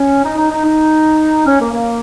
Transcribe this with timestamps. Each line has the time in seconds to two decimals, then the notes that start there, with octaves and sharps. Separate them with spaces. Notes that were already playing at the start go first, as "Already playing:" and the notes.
Already playing: C#4
0.23 D#4
0.36 D#4
0.50 D#4
0.63 D#4
1.45 C#4
1.59 A#3
1.72 A#3